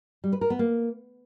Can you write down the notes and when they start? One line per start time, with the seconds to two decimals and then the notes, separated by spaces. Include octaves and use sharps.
0.24 G3
0.33 B4
0.41 A#4
0.50 B3
0.59 A#3